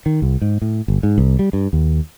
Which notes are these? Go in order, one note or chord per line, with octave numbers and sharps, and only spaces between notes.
D#3
C2
G#2
A2
G1
G#2
C2
G3
G2
D#2